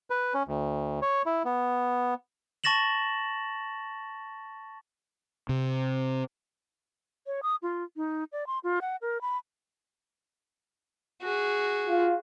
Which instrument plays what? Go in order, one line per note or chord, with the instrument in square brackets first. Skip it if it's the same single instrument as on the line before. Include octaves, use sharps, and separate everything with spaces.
[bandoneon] B4
C#4
D2
C#5
E4
B3
[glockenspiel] A5 C#6 A6 A#6 E7 F#7
[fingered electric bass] C3
[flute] C#5
D#6
F4
D#4
D5
C6
F4
F#5
A#4
B5
[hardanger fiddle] F#4 G#4
[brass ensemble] F4